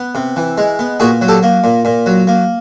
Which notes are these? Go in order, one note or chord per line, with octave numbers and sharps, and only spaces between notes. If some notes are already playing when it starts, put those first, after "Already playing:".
Already playing: B3
C3
E3
G#3
B3
A#2 F#4 G#4
F#3
G4 A4
A#3
A#2
A#2
F#3
A#3